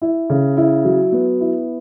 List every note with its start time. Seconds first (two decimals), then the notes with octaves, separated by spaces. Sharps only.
0.02 E4
0.30 C#3
0.57 E4
0.85 F#3
1.12 B3
1.41 E4